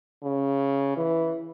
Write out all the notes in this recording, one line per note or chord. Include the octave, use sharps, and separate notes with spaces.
C#3
E3